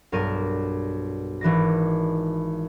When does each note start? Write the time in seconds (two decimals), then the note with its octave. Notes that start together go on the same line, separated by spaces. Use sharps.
0.12 B1 G2 A#4 D5 D7 D#7
1.41 G#1 E3 D5 A#6